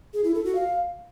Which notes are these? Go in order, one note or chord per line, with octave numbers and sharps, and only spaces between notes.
G#4
E4
A4
F#4
F5